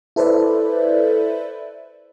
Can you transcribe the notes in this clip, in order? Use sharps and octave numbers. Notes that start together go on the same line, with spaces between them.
E4 A4 B4 C5 D5 E5